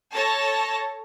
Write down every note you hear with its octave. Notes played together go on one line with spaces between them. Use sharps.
A4 C#5 A5 A#6